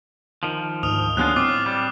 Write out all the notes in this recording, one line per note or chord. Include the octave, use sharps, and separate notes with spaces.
D#3 F3
D2 G#2 D#6 F6 F7
D#2 F#3 G#3 B3 D4 F4 D#6 F#6
A2 F#3 C4 F4 D6
G3